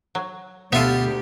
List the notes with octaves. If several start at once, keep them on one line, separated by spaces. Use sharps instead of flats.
F#3
D2 B2 B3 F4 G4 A4 E5